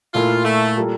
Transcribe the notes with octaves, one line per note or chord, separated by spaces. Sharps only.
A#2 A3 E4 F4 A#4
A3
G3 A#3 F4 A4